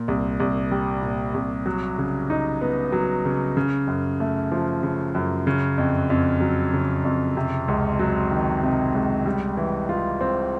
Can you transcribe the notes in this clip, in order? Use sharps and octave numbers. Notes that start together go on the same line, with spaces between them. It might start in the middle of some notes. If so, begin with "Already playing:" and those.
Already playing: A#2
C2
C2
G3
A#2
C2
F#3
C#3
D#4
B3
F#3
C#3
C#3
F#2
A3
F3
C#3
F#2
C#3
F2
F2
F#3
C#3
F2
C3
C#2
F#3
D#3
C3
C#2
G3
E3
F4
C4